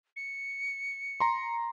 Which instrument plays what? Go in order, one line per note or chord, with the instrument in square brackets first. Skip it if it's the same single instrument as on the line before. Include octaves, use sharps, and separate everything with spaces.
[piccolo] C#7
[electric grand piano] A#5 C6